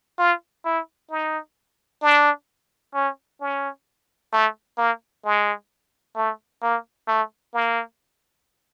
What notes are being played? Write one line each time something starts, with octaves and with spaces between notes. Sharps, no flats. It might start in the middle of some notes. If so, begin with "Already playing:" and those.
F4
E4
D#4
D4
C#4
C#4
A3
A#3
G#3
A3
A#3
A3
A#3